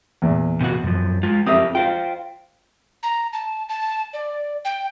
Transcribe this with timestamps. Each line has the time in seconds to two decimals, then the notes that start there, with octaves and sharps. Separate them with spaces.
0.22 E2 A#2
0.61 C3 A#3 F#4
0.83 F#2 F3
1.23 G#3 F4
1.46 F2 C4 G4 A#4 E5 D#6
1.75 F4 C5 F5 G5
3.03 A#5
3.33 A5
3.69 A5
4.13 D5
4.65 G5